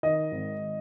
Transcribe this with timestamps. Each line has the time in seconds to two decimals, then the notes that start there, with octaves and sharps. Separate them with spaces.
0.03 D#3 D#5
0.32 G#1